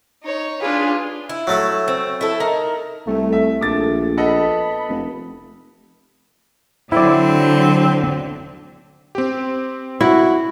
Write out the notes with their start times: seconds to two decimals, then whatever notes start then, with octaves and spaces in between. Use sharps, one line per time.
0.23 D#4 C#5
0.62 D4 F4 G#4 B4
1.29 E4
1.47 F#3 A3
1.88 C4
2.21 E4 A4
2.40 D#4 A#4 A#5
3.07 C2 A3
3.33 E5
3.61 A#1 D6 A6
4.17 B3 A4 D#5 B5
4.89 F1
6.92 D3 F#3 C4 E4 D5
9.15 C4 G4
10.01 E4 F#4